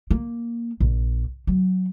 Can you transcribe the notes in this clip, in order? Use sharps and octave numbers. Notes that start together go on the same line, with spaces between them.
A#3
A#1
F#3